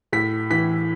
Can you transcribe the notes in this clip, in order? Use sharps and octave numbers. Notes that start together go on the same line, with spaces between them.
A2 B6
E3 B6